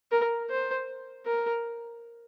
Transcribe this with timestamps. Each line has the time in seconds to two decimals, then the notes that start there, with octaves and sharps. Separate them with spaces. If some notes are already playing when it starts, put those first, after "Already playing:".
0.12 A#4
0.50 C5
1.26 A#4